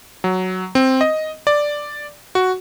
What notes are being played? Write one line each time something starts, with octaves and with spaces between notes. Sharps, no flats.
F#3
C4
D#5
D5
F#4